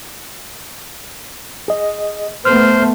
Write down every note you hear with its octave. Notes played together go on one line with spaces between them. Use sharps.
G#4 D#5
A3 B3 C5 F6